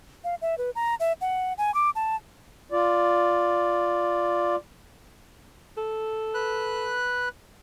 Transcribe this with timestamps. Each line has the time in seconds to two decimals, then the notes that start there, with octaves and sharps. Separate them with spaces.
0.24 F5
0.41 E5
0.58 B4
0.75 A#5
1.00 E5
1.21 F#5
1.58 G#5
1.74 D6
1.95 A5
2.72 F4 D5
5.77 A4
6.34 B4 F#6